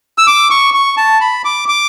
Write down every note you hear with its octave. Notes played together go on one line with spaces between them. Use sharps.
E6
D6
C#6
C#6
A5
B5
D6
D6